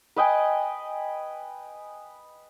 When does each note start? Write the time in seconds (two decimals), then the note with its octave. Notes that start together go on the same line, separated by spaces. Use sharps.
0.16 B4 D#5 G5 G#5